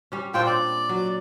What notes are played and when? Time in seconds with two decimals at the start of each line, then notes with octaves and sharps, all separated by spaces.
0.12 G3 C#4
0.34 A#2 C4 D4 F4 G5
0.46 D5
0.89 F#3